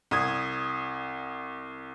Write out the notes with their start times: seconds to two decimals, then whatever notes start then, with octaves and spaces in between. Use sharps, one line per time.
0.11 C2 D#6 G#6